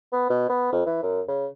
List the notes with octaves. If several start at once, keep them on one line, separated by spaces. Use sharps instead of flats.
B3
B2
B3
F2
E3
F#2
C#3